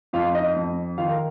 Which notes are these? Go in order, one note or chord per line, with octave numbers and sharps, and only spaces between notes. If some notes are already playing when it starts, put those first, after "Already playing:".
F2 F4 F5
D#4 D#5
F2
D#3 F4 F5
A#4